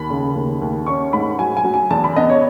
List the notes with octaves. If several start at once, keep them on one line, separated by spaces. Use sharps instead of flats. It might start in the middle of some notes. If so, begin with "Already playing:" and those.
Already playing: D#2 B5
C#3
D#2
D#2
C#4 C#6
G#2 B5
F#3 G#5
G#5
F#3
G#5
E2 A5
B5
B3 D#5
C#5